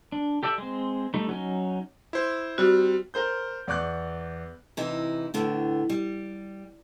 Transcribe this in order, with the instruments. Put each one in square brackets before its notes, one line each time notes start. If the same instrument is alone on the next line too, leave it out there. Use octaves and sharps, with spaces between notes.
[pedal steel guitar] D4
G4 A4 D5 E5 G5
G#3 C4
G3 A3 D#4
F#3 C#4 D#4
[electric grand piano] E4 C5
[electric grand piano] G3 C4 [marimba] F#4
[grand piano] A#4 C5 G6
E2 D5 C#6 D6 F#6
[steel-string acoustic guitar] C3 E3 D#4 E4
A2 D3 B3
G3